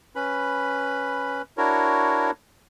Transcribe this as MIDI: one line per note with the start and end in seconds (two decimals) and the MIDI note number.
0.16 1.42 61
0.16 1.42 71
0.16 1.42 83
1.57 2.31 62
1.57 2.31 64
1.57 2.31 66
1.57 2.31 70
1.57 2.31 73